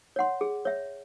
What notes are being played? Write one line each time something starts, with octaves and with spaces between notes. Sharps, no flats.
C#5 F#5 C6
G#4
C#5 E5